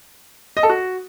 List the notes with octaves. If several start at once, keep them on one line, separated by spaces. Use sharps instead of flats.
D#5
A4
F#4